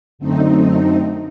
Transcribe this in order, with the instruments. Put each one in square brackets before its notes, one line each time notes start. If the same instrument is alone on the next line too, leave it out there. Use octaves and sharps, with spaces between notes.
[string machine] F#2 D3 A3 C4 D#4